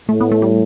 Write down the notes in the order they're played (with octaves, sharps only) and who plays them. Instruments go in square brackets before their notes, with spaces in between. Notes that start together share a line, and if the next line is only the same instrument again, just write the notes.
[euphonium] A2 [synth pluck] A3
[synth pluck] B3
A3
G3